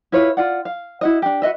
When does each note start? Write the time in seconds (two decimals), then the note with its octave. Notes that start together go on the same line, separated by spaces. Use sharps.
0.12 E4 F4 B4 C#5
0.37 F4 D5 F#5
0.65 F5
1.01 E4 F#4 D#5
1.22 D4 G4
1.42 F#4 B4 D#5 E5